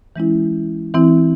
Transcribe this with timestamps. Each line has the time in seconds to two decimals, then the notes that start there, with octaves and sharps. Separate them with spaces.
0.16 E3 G#3 C#4 E4
0.94 E3 C4 E4